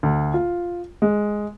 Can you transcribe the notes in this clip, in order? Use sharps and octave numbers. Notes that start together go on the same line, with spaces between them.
D2
F4
G#3